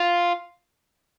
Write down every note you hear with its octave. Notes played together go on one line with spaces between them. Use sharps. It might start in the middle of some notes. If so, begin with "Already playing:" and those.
Already playing: F4